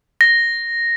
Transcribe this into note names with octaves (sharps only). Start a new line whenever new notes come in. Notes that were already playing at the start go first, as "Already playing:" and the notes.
A#6